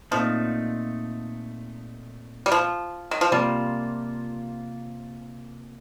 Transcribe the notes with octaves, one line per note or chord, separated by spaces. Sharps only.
A#2 F3 A3 C4 D#4
G3
F3
D#3
F3
C3 F3 G3 A#3 F4 C5